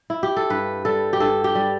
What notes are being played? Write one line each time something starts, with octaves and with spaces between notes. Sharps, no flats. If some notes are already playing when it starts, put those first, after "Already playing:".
Already playing: D4
E4
G4
A4
G2 B4
G3 A4
G4
G2 A4
G4
G3